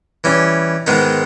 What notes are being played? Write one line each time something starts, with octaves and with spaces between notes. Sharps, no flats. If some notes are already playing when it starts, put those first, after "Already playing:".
E3 G3 C#4
G#2 D#3 G#3 B3 D#4